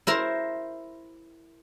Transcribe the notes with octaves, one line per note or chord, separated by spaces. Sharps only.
E4 A#4 C5 A#5